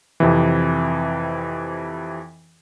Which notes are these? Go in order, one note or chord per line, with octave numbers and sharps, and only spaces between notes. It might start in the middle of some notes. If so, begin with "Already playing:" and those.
F2 C3 E3